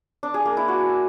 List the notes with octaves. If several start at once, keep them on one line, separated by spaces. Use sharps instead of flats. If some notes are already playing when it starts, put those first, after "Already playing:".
D4
G#4
A#3
E4
F#4